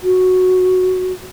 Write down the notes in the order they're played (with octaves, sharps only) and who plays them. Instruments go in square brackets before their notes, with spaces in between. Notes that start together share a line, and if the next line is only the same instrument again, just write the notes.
[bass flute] F#4